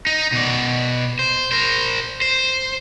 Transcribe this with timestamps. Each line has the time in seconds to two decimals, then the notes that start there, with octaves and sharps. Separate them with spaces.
0.07 D#4
0.32 B2 D5
1.19 C5
1.52 A#4 C5
2.22 C5